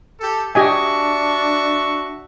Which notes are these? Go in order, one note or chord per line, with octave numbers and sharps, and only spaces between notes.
G4 A4
D4 F#4 G4 D#5 E5 G#5 C#6